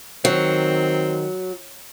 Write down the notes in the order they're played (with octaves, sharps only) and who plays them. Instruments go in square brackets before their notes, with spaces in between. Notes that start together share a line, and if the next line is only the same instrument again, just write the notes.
[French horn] D#3 [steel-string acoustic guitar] F#3 [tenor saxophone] C4